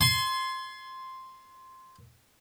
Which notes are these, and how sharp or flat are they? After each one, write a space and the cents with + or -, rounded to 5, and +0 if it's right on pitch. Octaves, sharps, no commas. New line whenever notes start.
G#5 +40 C6 +0